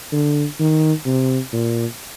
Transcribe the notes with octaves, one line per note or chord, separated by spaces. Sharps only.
D3
D#3
C3
A#2